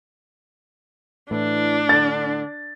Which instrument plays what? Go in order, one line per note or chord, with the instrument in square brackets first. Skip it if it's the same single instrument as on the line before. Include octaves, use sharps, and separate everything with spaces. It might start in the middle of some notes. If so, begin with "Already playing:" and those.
[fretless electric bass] A2 [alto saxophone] E3 [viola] D4
[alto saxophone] D3 [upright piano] A6